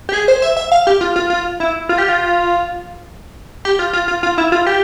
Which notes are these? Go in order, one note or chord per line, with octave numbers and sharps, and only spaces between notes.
G4
G#4
C5
E5
E5
F5
G4
F4
F4
F4
E4
F4
G4
F4
G4
F4
F4
F4
F4
E4
F4
G4